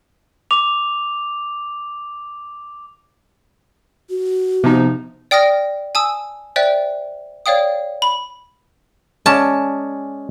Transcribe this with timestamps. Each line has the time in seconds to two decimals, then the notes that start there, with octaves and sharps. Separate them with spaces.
0.51 D6 F7
4.10 F#4
4.64 C3 F3 B3 D#4
5.31 D5 G5 D#6 F6 A#6
5.95 G#5 A5 D#6 E6
6.56 C5 D5 E5 G5 F#6
7.46 C#5 D5 F5 G5 D#6
8.02 B5
9.26 G#3 C#4 D5 A5